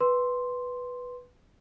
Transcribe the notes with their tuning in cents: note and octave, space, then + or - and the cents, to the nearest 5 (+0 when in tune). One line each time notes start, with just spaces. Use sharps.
B4 +0 C6 +0